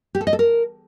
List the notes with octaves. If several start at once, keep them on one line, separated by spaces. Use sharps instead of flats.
G4
A4
D#5
A4
A#4